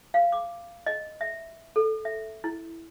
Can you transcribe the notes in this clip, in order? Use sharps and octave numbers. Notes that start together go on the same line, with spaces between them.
F5
D6
D#5
E5
A4
E5
E4